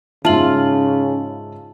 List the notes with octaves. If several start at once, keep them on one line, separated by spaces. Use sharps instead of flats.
G#2 C#3 D#4 F4 E5 A5 F#7